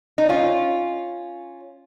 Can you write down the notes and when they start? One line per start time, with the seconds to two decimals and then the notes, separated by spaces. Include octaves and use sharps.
0.18 D#4
0.29 C#4 F4